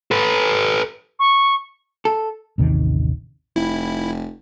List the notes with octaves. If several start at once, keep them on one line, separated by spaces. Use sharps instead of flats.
A4 B4
C#6
A4
A1 D#2 C3 D#3
F1 E4